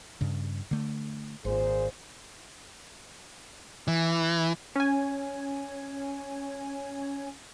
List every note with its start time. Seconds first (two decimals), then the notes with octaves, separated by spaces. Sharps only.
0.21 G2 C#3
0.71 D3 A3
1.45 G#1 A#2 G#4 C5
3.88 E3
4.76 C#4 G#5